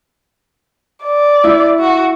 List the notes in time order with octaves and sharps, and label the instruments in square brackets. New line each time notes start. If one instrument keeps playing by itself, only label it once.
[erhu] D5
[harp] E4
[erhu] F#4